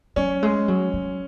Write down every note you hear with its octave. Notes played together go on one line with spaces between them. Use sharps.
F#3 C#4
G#3
F#3
F#3